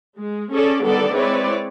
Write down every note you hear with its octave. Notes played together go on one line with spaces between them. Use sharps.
G#3
C#4 G#4 A4 D5
D3 D#3 G3 B3 A4 D5
G#3 C4 E4 B4 C#5 D5